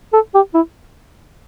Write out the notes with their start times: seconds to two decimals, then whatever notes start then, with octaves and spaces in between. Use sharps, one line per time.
0.13 A4
0.34 G4
0.54 E4